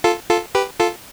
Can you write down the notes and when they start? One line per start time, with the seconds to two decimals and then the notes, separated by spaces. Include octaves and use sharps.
0.04 F4 A4
0.30 F4 A4
0.55 G4 B4
0.80 F4 A4